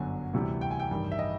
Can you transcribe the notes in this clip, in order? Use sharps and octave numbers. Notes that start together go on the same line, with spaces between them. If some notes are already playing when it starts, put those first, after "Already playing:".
Already playing: G1 F#2 D3 F#3 G#5
D2 C3 E3 G3
G5
G#5
G5
A1 G2 D#3
E5
D#5